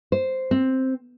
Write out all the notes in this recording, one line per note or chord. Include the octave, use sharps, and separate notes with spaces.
C5
C4